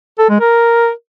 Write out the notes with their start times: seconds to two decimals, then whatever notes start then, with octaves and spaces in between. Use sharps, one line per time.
0.19 A4
0.29 G#3
0.40 A#4